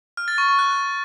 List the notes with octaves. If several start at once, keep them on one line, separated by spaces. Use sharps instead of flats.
F6
A6
C#6
C#6
F#6